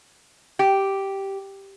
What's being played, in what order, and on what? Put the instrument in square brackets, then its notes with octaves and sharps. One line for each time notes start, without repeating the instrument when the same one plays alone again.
[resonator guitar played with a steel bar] G4